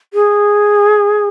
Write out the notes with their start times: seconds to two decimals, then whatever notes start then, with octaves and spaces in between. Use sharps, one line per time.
0.13 G#4